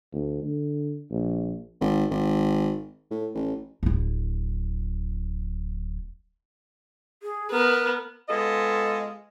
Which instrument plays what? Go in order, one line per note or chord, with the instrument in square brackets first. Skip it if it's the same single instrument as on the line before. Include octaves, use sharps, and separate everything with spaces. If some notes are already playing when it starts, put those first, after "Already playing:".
[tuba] D2
D3
A#1
[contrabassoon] G#1
G#1
A2
A1
[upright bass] D1 E4
[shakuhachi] G#4
[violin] B3 [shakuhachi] A#4
[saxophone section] G#3 B3 F4 A4 D#5